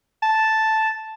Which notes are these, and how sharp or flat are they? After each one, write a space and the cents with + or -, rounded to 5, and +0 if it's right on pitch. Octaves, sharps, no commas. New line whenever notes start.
A5 -5